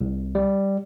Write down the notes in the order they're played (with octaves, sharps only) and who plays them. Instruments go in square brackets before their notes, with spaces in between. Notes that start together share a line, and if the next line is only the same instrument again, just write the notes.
[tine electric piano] C2
G3